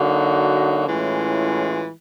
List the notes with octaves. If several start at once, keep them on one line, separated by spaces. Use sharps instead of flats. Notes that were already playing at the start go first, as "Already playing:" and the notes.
Already playing: D3 F#3 A#3 D#4 F#4
A2 E3 G#3 C#4 F4